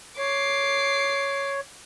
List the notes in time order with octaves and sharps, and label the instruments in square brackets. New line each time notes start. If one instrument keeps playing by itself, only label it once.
[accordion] C#5 [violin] D6 C7